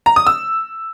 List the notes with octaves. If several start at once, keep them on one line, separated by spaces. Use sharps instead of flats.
A#5
D#6
E6